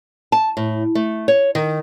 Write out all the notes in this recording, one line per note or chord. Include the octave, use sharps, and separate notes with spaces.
A5
A2
A3
C#5
D#3